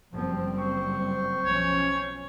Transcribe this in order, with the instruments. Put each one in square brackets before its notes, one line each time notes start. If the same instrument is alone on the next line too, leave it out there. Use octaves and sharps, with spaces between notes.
[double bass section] F#1 G3 C4 [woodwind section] F3
[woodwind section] C5 C#6
[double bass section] B1 F3 C#4 [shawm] C#5